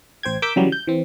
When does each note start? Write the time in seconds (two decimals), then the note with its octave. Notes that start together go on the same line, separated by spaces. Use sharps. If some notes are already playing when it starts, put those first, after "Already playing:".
0.23 A1 C5 G5 G#6
0.42 A#4 D6 E6 G6 B6
0.56 C#3 E3 F#3 G3
0.72 G6
0.87 E3 C4